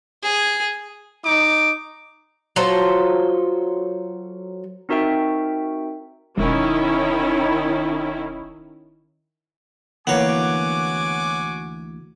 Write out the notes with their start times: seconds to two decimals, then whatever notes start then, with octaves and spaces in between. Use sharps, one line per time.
0.23 G#4
1.23 D#4 D6
2.56 F#3 F4 A4 C5
4.89 C4 D#4 F#4 A#4 E5 G5
6.38 E1 D#3 C#4 E4
10.07 D2 E3 A#3 B3 F#4 C#5 G#5 D6